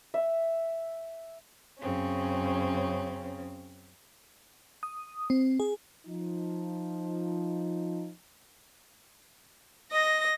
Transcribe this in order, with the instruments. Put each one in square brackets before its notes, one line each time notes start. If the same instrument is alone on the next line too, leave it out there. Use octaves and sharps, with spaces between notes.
[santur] E5
[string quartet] F#2 C#3 C4 C#4
[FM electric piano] D#6
C4
G#4
[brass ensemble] F3 D#4
[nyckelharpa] D#5 [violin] A#6